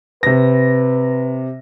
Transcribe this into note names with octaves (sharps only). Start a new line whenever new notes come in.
C3 B4 A#6